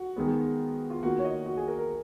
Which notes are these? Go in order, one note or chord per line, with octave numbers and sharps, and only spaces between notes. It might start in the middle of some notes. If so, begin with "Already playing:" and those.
Already playing: F#4
D#3 G#3 B3
F4
D#3 A#3 F#4
C#5
D#5
F#4
G#4
A#4
A#4